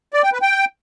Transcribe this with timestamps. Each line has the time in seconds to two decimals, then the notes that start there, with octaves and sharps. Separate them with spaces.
0.14 D5
0.23 G5
0.32 B4
0.42 G5